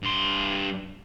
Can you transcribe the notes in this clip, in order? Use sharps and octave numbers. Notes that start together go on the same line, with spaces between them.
G2 C6